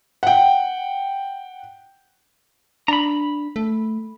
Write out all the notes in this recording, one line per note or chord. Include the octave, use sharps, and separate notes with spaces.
F#5 G5
D4 A#5 B5
A3